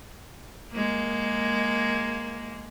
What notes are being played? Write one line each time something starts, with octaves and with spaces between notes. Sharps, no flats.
G#3 A#3